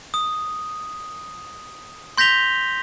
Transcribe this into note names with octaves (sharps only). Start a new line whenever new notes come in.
D#6
C6 G6 A#6 B6 F7 G7